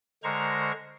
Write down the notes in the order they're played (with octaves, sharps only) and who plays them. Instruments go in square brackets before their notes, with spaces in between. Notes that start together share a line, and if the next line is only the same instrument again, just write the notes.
[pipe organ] D3 G#3 A#4 C5 A#5 C#6